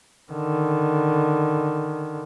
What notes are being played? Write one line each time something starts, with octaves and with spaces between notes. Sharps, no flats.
D3 D#3